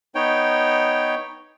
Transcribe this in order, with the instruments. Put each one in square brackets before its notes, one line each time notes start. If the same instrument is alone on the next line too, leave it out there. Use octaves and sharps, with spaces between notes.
[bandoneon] B3 D#4 C#5 G5